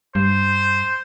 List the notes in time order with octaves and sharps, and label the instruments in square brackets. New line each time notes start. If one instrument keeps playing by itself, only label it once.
[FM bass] G2 [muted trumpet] C5